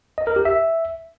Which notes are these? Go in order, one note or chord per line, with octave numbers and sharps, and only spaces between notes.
D#5
A#4
G4
E5